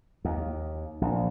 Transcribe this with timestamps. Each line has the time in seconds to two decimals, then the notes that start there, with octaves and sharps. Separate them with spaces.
0.25 D#2
1.01 A#1